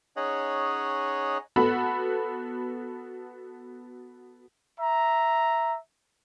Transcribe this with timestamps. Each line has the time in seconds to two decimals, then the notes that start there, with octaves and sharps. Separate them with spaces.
0.17 C#4 D#4 G#4 C#5 D#5 F#5
1.56 B3 F#4 A4 F#5 B5
4.80 E5 A#5